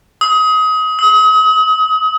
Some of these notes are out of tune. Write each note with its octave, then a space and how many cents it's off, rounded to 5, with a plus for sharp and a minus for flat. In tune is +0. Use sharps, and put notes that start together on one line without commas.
D#6 +25
D#6 +40